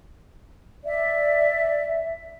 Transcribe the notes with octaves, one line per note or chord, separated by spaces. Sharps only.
D5 E5